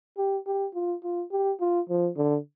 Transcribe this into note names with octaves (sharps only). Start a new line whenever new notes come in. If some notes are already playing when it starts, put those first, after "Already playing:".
G4
G4
F4
F4
G4
F4
F3
D3